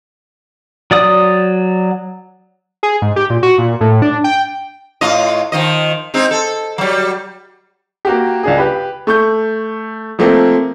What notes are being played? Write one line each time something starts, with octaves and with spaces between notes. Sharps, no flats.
F#3 D5 D#6
G#4
G#2
G4
A#2
F#4
A#2
A2
D4
G5
A2 F4 D#5
D#3 F3 D#5
G#3 C4 D#4
A4
F#3 G3
A#3 F#4 G4
C#2 D4 G#4
G4 B4
A3 C#6 G6
F3 A3 A#3 C4